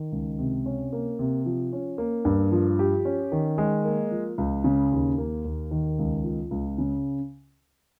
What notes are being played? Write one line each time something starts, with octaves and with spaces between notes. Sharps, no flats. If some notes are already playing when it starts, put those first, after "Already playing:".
Already playing: D#3
C#2
C3
C#4
A#3
C3
F3
C#4
A#3
G2
F3
G4
C#4
D#3
G#3
A#3
F3
C#2
C#3
D#2
A#3
D#2
D#3
C#2
F3
C#2
C#3